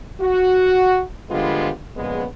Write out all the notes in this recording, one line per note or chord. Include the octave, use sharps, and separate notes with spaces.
F#4
D3 F3 G3 G#3 B3 F4
A#1 G2 C#3 G#3 B3